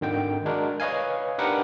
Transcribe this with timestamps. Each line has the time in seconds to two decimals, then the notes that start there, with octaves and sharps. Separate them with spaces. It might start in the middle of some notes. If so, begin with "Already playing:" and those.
0.01 G#1 D3 D#3 G5
0.45 G#3 D4 F#4 A#4
0.80 B4 C#5 D#5 F5 G#5
1.38 D4 D#4 G4 A#4 B4 F#5